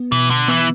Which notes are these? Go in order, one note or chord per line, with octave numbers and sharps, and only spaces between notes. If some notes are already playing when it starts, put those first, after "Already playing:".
Already playing: B3
B2 E3
D3
E3 B3